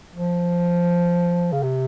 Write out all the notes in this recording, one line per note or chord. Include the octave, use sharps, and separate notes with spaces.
F3
C#3
C3